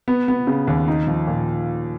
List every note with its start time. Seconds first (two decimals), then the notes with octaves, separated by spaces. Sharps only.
0.08 B3
0.28 B3
0.47 C#3
0.67 D#2
0.88 D#4
1.07 F3
1.27 A#2